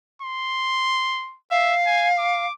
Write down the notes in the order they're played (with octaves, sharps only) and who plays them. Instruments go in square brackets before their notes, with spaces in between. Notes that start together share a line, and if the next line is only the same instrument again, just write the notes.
[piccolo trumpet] C6
[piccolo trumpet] E5 [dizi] F5
[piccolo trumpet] G#5
D6